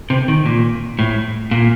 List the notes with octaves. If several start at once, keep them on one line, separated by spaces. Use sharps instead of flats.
C3
D#3
A#2
A2
A#2